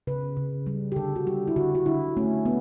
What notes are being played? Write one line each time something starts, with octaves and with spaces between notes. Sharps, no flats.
C#3 B4
C#3
G3
G4
D3 A4
F#4
G3 G4
E4
D3 F#4
F#4
D3 E4
A3 C#4
B3